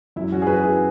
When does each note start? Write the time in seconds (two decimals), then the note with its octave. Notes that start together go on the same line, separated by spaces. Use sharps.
0.16 F#2 E4
0.32 C#4 F#4
0.42 G#4
0.47 F#3 F#4 B4
0.63 E4 G#4